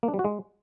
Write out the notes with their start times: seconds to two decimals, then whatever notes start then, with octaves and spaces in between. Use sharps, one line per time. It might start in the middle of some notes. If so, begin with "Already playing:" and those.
0.03 A#3
0.08 D4
0.14 G3
0.19 F#4
0.24 G#3